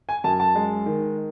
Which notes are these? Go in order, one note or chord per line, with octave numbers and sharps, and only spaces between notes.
G#5
F#2 A5
A5
G#3
D#3